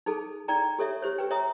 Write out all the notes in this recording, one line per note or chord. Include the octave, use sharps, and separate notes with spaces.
D#4 G#4 A4 A5
D#4 D5 G5 A#5
G4 A4 C#5 E5
G4 C5 C#5
G4 B4 G5
C#5 E5 A#5 D#6